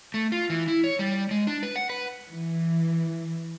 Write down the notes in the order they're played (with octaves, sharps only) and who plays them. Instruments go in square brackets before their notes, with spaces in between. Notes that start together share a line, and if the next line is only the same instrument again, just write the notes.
[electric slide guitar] A3
F4
E3
E4
C#5
G3
G#3
D4
B4
F#5
B4
[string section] E3